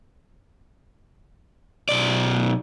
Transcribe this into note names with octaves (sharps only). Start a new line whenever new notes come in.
B1 D5